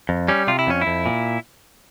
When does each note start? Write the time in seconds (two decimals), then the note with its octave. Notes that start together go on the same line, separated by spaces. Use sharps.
0.09 F2
0.28 G3 C#4
0.47 C3 F4
0.59 E4
0.67 F2 C#4
0.81 E4
0.87 F2
1.06 A#2